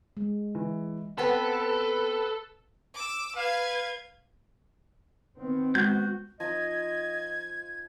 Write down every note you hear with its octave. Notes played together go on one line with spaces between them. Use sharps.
G#3
E3
B3 C4 A4 B4
D6 E6
B4 F5 G#6
D#3 B3 C4
G#3 F#4 G6
F3 D#4 D#5 G#6